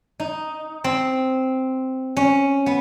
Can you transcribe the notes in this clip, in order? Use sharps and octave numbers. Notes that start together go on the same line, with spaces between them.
D#4
C4
C#4
B3